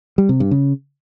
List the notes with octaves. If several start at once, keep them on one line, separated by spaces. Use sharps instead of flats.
G3
C3
G2
C#3